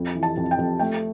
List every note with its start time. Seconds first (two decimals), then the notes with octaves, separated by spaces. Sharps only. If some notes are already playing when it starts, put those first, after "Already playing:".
Already playing: F2
0.15 E3
0.23 A5
0.37 F2
0.51 G5
0.58 F2
0.79 A3 G5